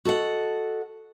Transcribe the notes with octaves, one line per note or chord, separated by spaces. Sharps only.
F#4 A4 D#5 F#5